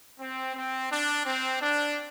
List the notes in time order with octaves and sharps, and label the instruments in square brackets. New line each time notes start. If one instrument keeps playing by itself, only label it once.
[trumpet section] C4
C4
D4
C4
D4